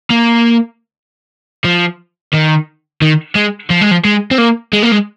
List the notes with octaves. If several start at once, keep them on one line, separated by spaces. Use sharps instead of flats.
A#3
F3
D#3
D#3
G#3
F3
G#3
F3
G#3
C4
A#3
G#3
A#3
G#3